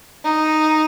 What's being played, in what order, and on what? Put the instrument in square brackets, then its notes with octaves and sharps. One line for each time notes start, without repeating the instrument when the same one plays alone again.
[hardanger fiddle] D#4